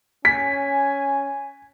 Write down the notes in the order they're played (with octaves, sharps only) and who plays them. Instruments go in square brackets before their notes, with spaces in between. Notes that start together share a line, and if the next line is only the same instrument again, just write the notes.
[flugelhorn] C#4 [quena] G#5 [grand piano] B6